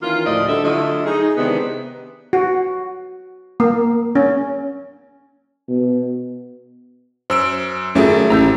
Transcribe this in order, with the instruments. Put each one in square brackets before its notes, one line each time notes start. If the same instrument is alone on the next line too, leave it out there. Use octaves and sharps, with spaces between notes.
[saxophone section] D#3 E3 A#3 C#4 F4
D2 A2 F3 D5 D#5
D3 G3 E5
D3 F#3 A3 E4 F4 D#5
D#4 G#4
C3 D#3 E3 G#3 B3 D4
[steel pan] F#4
A#3
C#4
[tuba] B2
[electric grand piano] F#2 E6 D7 [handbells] C5
[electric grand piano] G#1 A3 E5 [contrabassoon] F#2 [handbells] C#4 F4 G#4
[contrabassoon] A1 [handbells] A#5 E6 G6